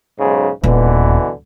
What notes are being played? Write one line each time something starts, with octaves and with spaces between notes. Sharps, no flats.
B1 G#2 C#3
D#1 B2 D3 E3